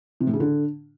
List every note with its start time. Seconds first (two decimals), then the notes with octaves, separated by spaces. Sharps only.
0.20 C3
0.27 A2
0.34 C#3
0.40 D3